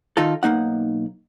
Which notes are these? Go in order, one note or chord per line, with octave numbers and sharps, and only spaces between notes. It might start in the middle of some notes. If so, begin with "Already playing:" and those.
D#3 D#4 F4 A4
B1 A#3 D#4 F#5